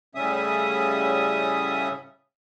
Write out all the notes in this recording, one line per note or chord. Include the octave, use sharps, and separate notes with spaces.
A2 C#3 G3 C#4 E5 D#6